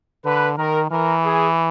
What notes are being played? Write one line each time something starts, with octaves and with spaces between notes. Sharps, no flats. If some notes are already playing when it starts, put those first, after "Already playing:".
D3 B4
D#3 A#4
E3 A#4
G#4